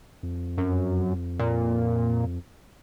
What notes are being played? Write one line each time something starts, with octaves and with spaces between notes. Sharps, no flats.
F2
F#2
A#2